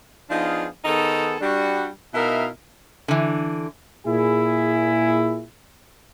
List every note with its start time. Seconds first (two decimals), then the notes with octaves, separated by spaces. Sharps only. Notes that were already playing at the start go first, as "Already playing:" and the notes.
0.30 F3 B3 D4 D#4 F4 G#4
0.85 D#3 B3 D#4 G#4 A4
1.41 G3 D4 F#4
2.14 B2 D#4 E4 A#4 E5 F5
3.08 D3 E3
4.06 A#2 E4 G#4